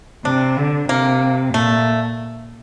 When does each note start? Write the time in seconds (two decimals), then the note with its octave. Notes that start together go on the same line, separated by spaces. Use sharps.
0.24 C3 D4
0.57 D3
0.89 C3 A#3
1.54 A#2 A3